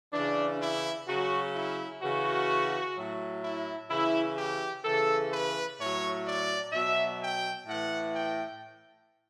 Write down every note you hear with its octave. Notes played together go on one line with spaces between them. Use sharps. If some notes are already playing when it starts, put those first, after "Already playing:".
C#3 E3 D4
E4
C#3 F#3 F#4
E4
C#3 E3 F#4
A2 F#3
E4
C#3 E3 E4
G4
C#3 E3 A4
B4
A2 F#3 C#5
D5
B2 F#3 E5
G5
A2 E3 F#5
G5